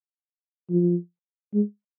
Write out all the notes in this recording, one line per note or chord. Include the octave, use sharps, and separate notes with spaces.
F3
G#3